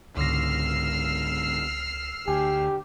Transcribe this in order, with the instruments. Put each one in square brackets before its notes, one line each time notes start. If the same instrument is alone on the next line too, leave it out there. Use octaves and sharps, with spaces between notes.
[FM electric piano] C#2 A#6 [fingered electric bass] G#2 D3 [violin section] E6 F6 C7
[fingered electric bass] D2 [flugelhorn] G4 [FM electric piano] G#5